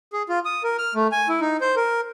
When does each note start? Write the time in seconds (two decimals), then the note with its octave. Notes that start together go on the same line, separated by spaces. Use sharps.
0.13 G#4
0.29 F4
0.45 D#6
0.63 A#4
0.78 F6
0.95 A3
1.12 G#5
1.29 E4
1.41 D#4
1.61 C5
1.76 A#4